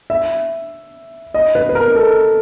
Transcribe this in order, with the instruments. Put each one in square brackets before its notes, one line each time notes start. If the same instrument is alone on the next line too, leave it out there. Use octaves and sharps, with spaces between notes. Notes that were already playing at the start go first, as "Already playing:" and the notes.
[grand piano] E5
D#5
B4
B4
A#4
A4